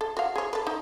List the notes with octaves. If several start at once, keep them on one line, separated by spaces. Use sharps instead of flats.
A4
F#4 F5
G#4 C#5
A4 B4
D#4